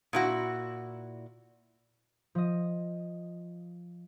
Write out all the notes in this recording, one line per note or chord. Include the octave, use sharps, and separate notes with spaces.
A#2 E4 F#4
F3 D#5